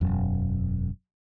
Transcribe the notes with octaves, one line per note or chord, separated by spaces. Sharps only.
E1 F#2